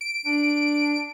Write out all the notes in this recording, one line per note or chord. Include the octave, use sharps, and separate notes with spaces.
D7
D4